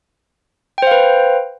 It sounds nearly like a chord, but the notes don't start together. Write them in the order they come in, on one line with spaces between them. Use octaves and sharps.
G5 C5 F5 B4